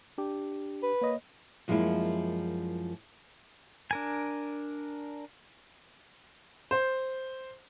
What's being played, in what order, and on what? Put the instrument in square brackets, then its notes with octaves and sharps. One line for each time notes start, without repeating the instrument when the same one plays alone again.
[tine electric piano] D4 G4
[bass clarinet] B4
[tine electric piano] A#3 C#5 D#5
[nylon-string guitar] F#2 F3 G#3 A#3 E4
[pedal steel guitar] D4 A#4 G#5
[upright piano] C5